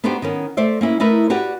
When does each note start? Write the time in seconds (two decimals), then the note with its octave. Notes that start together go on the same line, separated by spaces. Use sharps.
0.04 B3 D4 D#4 F#4 G4 C5
0.22 D#3 B3 C#4
0.57 A3 C5 D5 E5
0.81 A#3 C#4 E4
1.00 A3 D#4 E4 A#4 B4 E5
1.30 F#4 G4 B4 D5